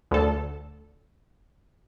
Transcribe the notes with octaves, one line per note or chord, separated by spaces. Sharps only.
D2 A4